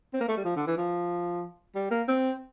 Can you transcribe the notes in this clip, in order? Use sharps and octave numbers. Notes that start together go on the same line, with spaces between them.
C4
A#3
A3
G3
F3
D3
E3
F3
G3
A#3
C4